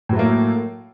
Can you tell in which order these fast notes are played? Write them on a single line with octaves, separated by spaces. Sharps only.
A2 F#3 A3 A#3